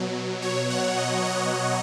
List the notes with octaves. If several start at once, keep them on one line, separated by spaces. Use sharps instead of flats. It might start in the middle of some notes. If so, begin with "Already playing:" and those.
Already playing: B2 F#3
C#5
F#5
D#5
D#5